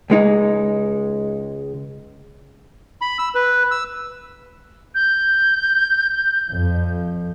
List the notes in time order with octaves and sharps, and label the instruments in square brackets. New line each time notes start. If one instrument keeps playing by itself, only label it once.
[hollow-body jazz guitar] C#2 G#3 D#4
[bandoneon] B5
E6
B4
E6
[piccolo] G6
[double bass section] F2